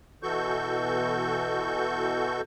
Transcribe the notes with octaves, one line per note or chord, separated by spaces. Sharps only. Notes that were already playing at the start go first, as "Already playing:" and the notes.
B2 E3 F#4 A4 C#6 G6